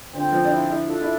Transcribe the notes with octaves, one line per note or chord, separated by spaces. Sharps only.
D3 C4 F4 C5 G5
F3
D4
E4
E4
D4 F4 A4 E5
E4